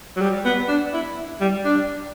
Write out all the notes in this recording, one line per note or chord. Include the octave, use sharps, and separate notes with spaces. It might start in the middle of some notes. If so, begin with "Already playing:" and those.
F#3
G3
B3
D4
E4
G3
D4